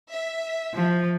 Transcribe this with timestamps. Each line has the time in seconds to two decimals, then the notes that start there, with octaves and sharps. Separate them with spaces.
0.11 E5
0.75 F3